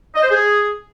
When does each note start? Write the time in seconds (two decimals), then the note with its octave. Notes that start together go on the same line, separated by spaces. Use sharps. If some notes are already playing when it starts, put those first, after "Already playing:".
0.15 D#5
0.23 C5
0.30 G#4